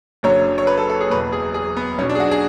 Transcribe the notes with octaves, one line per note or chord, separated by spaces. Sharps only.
F#1 F#2 D3 F#3 C#5
C#5
B4
A4
A4
G#4
F#1 E2 B2 F#3 B4
G#4
G#4
B3
B1 B2 F#3 C#4
D4
G#4
F#4
G#4